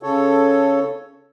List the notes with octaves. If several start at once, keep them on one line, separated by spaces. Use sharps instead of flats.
C#3 A4 C#5